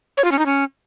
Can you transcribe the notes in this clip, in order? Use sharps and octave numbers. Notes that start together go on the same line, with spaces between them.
C#5
F4
C#4
D#4
C#4